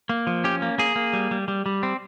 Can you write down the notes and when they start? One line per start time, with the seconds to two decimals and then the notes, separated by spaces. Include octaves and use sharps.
0.09 A#3
0.27 F3
0.44 C#4 G4
0.62 A#3
0.78 A#3 G#4
0.96 A#3
1.13 G3
1.31 G3
1.48 G3
1.66 G3
1.83 C4